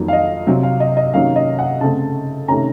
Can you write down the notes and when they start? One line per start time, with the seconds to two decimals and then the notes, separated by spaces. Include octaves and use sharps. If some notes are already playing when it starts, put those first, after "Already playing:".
Already playing: F2 D#3 F#3 A#3
0.08 F5
0.13 D#5
0.46 C3 F#3 C4
0.63 F5
0.80 D#5
0.97 D#5
1.13 C3 D#3 F#3 A#3 C#4 F5
1.36 D#5
1.59 F#5
1.81 C#3 A3 C4 A5
2.48 C3 D#3 A3 C#4 A#5